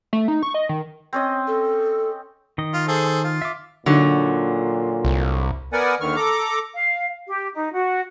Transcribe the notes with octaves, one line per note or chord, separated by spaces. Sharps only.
A3
D#4
C#6
D#5
D#3
C4 C#4 D#5
A4
D#3 D#5
F4
G#4 A4 C5
F4
E5 D6
A#2 D3 F#3 D#4
C2
B3 A#4 B4 D5 F#5 G#5
D#2 D3 D#3 C#6 F6
A4 A#5 D6
F5
G4
D#4
F#4